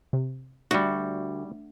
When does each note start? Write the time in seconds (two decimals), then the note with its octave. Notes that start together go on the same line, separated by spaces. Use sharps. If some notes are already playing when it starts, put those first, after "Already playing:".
0.13 C3
0.71 D2 G3 F#4